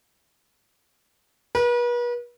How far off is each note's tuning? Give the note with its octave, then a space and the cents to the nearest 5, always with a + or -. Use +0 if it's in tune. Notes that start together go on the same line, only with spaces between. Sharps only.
B4 -40